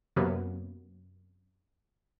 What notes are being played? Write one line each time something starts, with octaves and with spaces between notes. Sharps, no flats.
F#2 C3 F#3 A#3 B3